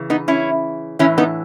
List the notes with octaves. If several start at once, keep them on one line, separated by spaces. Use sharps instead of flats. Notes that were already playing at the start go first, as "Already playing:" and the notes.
Already playing: C#3 E3
B3 D#4
C#4 E4
A2 E3 C#4 E4
B3 D#4